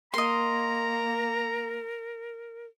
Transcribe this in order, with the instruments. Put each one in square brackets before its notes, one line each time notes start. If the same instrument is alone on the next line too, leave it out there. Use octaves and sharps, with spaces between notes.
[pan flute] A#3 [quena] A#4 [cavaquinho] D#5 C6 [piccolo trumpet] A#5